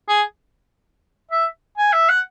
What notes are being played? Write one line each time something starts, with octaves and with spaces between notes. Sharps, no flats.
G#4
E5
G#5
E5
F#5